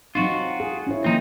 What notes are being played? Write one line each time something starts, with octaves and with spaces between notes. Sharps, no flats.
F#3 C4 D#4 F4 F#4
G#4
C#4 E4 C#5
D#3 F3 A#3 C4 D#4